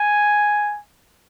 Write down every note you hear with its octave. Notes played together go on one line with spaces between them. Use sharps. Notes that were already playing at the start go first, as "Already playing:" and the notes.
Already playing: G#5